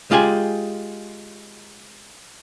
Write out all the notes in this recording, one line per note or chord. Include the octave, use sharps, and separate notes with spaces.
G#3 F4 G4 G#4 G#5